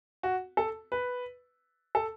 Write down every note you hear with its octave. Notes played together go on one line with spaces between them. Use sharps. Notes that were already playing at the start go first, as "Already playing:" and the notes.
F#4
A4
B4
A4